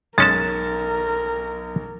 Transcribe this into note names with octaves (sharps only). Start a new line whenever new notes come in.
B1 G#3 C#4 A#4 A5 A6